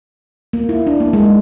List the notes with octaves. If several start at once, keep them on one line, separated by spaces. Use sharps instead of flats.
A#3
E4
D4
A#3
G#3